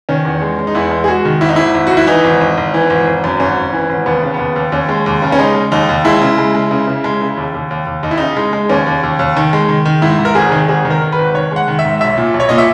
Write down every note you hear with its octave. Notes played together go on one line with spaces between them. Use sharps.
D#3 C#4
E2
G#3
G#3
D#4
E2 E4
G#3
G#4
G#3 F#4
D#3
G#1 E4
D#4
G#1 E4
G#1
G#1 F#4
E4
E3 D#4
G#1
G#1
G#1
E3
G#1
G#1
F#2
G#1 C#4
G#1
E3
G#1
D#2 B3
C#3
B3
D#2
D#2
D#2 C#4
G#3
D#2
C#3
C#4
G#3 D#4
G#3
D#2 D#4
D#2
G#3 E4
C#3
G#3
G#3
C#3
C#3
G#3
C#3
D#2
D#2
D#2
D#2
D#2 D#4
E4
C#3 D#4
G#3
G#3
D#2 C#4
D#2
D#2
D#2
D#3
G#3
D#3
D#3
G#2 E4
G#2
A#4
G#1 G#4
D#3
G#1 G#4
D#3
A#4
D#3
B4
G#1
D#3 C#5
G#3 F#5
D#3
E5
G#2
B1 E5
A#2
B1
C#5
A#2 D#5
E5